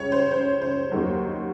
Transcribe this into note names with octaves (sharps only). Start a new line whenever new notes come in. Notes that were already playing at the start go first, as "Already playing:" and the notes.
Already playing: C#2 C#3 C#5
C5
C5
C5
D#2 D#3 F#3